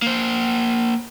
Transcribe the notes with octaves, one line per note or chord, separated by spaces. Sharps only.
A#3 C5